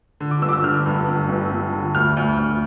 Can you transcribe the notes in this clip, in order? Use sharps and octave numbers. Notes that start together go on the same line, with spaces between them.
D3
D6
G1 E6
D6
E6
D3 F6
G2
G1
G1
G1
D3
D2 F6
D2
D2